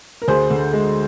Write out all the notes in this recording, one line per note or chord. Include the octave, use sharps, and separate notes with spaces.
A#4
D2 G#4 C5
D3
G#3